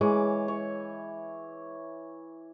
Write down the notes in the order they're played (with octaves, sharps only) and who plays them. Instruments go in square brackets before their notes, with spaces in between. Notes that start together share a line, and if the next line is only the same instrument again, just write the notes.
[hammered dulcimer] E3 C#5 D6 [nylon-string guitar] G#3
[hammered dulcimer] C#5